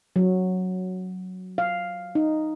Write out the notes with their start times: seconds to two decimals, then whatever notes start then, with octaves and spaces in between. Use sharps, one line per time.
0.16 F#3
1.58 F5
2.15 D#4